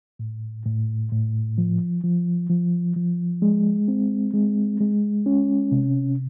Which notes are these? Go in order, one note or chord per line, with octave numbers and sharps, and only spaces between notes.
A2
A2
A2
F3
F3
F3
F3
G#3
C4
G#3
G#3
C#4
C3